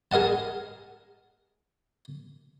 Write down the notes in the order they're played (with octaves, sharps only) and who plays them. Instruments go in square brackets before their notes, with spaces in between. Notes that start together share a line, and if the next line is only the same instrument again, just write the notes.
[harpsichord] G#4 A#4 D#5 F#5 A5